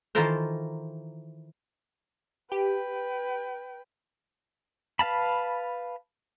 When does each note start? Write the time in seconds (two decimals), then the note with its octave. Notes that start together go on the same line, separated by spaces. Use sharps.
0.15 D#3 E3 F4 A4 A#4 C5
2.52 G4 B4 G5
4.99 B4 F5 A5 B5